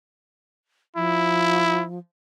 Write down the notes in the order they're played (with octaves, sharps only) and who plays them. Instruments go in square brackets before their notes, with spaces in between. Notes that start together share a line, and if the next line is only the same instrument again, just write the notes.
[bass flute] F3 [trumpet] E4